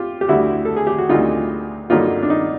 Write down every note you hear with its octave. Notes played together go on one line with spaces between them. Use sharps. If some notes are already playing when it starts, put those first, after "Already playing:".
Already playing: F4 G4
G4
D2 D3 G3 E4 F#4
A4
G#4
G4
F#4
D2 D3 G3 D#4 F4
G2 D3 F#3 A#3 D#4 F4
D4
D#4